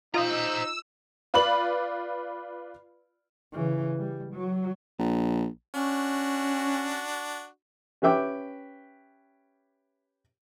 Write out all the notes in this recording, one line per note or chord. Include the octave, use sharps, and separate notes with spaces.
D#4 F4 C5 D#5 A#5 E6
F4 B4 D5 B5 F#7
C#3 E3
G3
F#3
A#1
C#4 D4 F#4
C#4 G4 B4 E5 G5 D6